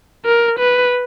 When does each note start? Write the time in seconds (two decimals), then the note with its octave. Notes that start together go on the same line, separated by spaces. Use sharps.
0.25 A#4
0.59 B4